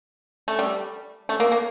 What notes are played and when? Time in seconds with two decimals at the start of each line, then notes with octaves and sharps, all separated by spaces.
0.48 A3
0.59 G3
1.29 A3
1.40 A#3
1.52 A#3